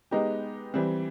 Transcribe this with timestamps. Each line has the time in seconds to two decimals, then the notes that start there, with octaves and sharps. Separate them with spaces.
0.11 G#3 B3 D#4 G4
0.74 E3 G3 C4